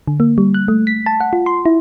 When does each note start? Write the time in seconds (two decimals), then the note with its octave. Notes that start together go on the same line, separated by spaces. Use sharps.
0.08 D3
0.20 A#3
0.38 G3
0.54 F#6
0.68 A3
0.87 B6
1.06 A5
1.20 F#5
1.33 F4
1.46 C6
1.66 E4